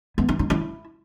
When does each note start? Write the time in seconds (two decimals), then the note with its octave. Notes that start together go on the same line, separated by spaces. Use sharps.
0.18 B3
0.29 D#4
0.39 D#4
0.50 E4